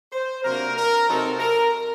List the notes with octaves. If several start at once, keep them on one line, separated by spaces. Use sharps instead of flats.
C5
C3 F#3 A#3 D4 A#4
A#4
C3 F#3 C4 D#4 A4
A#4